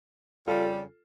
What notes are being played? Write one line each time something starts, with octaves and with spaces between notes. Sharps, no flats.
F2 C#3 G3 F4 A4